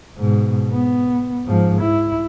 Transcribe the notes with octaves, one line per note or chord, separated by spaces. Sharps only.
G#2 B2
B3
G#2 F3
E4